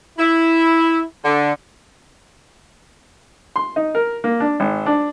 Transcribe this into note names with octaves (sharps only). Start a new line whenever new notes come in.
E4
D3
C6
D#4
A#4
A#3
D4
G#1
D4